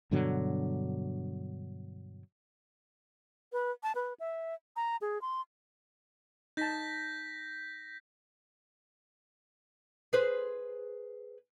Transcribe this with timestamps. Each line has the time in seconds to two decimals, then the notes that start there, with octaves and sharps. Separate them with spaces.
0.11 G2 B2 D3 F#3
3.52 B4
3.83 A5
3.95 B4
4.20 E5
4.76 A#5
5.01 G#4
5.22 C6
6.57 D#4 A5 G6 A#6 B6
10.13 G#4 B4 C5